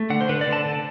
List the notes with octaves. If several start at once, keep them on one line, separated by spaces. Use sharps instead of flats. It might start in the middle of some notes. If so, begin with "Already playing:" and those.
Already playing: A3
D3 F#5
C5
D3 B4
D5
D3
A5
D3